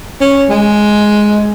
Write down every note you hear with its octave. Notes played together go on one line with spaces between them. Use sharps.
C#4
G#3